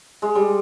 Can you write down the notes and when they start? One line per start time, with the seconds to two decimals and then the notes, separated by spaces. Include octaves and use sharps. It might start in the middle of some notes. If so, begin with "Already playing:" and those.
0.22 G#3
0.35 G3